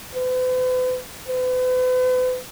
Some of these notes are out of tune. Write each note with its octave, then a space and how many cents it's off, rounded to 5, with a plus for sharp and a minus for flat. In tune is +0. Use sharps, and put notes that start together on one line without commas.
B4 +45
B4 +45